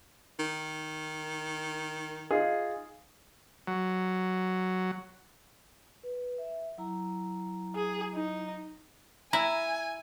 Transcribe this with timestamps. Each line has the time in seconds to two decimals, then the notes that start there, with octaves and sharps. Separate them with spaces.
0.39 D#3
2.31 D#4 F4 G#4
3.67 F#3
6.03 B4
6.38 E5
6.78 F#3 E4 A#5
7.76 G#4
8.15 D#4
9.33 E4 G#5 A#5